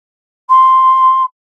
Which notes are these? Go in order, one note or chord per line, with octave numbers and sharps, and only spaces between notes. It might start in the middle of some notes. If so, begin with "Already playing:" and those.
C6